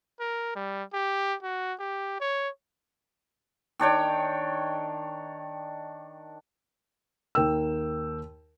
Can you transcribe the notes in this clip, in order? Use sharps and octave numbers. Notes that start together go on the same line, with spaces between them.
A#4
G3
G4
F#4
G4
C#5
D#3 D4 C#5 G5
D#2 A#4 G5 E6